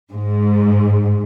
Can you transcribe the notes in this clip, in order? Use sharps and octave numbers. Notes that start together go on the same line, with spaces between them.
G#2